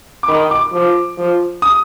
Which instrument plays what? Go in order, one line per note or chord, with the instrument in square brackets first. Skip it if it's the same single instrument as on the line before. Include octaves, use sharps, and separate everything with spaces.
[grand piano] D6
[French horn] D#3 [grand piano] B5
[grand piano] D6
[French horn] F3
F3
[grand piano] D#6